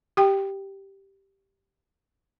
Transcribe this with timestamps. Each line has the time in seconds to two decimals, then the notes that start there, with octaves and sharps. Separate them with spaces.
0.17 G4 G5